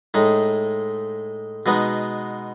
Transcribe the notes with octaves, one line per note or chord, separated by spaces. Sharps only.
A2 G#3 D#4
B2 G#3 B3 D#4